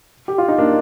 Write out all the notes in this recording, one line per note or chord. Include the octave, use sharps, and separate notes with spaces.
G4
F4
D#4
A#3 D4